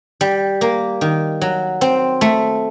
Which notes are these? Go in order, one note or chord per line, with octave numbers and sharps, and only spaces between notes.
G3
A#3
D#3
F#3
C4
A3